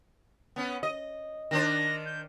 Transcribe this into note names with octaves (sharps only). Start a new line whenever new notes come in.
B3 C#4
D#5
D#3 D4 C5 A#6
G6